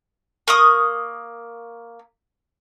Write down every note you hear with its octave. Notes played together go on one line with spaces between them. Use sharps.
A#3 C#6 D#6